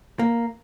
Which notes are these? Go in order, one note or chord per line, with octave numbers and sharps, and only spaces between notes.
A#3